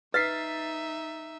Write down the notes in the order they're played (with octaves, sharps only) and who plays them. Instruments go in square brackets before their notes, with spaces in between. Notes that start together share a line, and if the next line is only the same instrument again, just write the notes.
[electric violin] D#4 E5 [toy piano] B4 [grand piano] A6 B6 C7